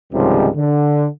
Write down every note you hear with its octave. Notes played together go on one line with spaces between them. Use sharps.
C#2 G#2 C3 D#3 F3 G3
D3